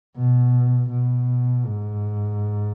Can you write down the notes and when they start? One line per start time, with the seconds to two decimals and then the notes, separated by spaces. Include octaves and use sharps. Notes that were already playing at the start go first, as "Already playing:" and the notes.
0.17 B2
0.90 B2
1.65 G#2